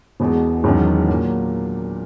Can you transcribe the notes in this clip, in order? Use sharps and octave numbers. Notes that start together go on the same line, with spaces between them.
E1 E2 B2 G#3
E1 E2 D#3 F#3 C#4
A#2 F#3 A#3